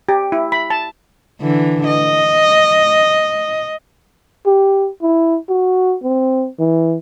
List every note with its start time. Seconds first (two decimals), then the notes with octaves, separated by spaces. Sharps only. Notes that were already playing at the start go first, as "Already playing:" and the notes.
0.09 G4
0.32 E4
0.52 B5
0.70 A5
1.41 D3 E3
1.87 D#5
4.46 G4
5.02 E4
5.49 F#4
6.03 C4
6.59 E3